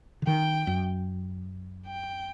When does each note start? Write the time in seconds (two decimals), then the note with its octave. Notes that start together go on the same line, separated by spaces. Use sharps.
0.22 D3
0.27 D#3 G5
0.67 F#2
1.87 G5